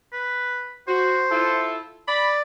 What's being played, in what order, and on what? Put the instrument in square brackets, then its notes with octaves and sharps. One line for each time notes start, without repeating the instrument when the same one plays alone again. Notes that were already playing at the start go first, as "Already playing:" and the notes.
[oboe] B4
[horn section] F#4 [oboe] C5
[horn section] E4 F4 A4
[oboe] D5 [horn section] B5